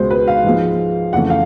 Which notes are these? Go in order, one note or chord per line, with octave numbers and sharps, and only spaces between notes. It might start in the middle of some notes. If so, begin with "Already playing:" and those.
Already playing: C#2 B2 G#3 C5
B4
F5
G#2 F3 G#3
F2 C#3 E3 A3 F#5
F5